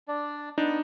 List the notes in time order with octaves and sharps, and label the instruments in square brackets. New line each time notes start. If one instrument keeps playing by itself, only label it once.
[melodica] D4 D5
[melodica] B3 [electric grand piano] D4 D#4